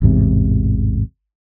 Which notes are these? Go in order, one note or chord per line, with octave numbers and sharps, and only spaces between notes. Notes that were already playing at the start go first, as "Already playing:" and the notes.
A1 E2 G#2 C3